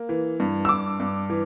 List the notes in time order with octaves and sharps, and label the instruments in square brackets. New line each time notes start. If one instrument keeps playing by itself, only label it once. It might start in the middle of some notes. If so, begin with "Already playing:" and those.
Already playing: [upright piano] A#3
E3
G2
E6
G2 D6
G2
E3